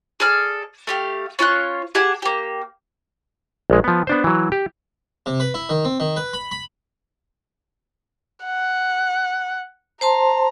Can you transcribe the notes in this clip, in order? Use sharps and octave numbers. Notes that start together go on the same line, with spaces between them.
G#4 A4 D5 F6
A3 G4 F5
C#4 F4 C#5 F#6
G4 G#4 F#5 A5
A#3 G4
A#1 G#3
F3 B3
B3 D4 C5
E3 F#3
G4
C3
B4
E4
D#3
C4
D#3
B4
B5
B5
F#5
C5 A5 A#5 C6